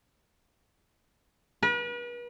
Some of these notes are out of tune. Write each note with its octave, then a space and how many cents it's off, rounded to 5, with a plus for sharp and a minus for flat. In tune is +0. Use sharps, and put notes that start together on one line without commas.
B4 -40